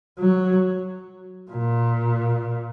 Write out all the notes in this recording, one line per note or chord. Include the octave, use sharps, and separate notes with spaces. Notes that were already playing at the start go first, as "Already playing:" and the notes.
F#3
A#2